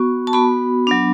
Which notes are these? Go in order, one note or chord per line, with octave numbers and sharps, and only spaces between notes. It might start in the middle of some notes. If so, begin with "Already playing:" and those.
Already playing: B3 F#4 C#6
A5
B3 F#4 B5
F#3 B3 D4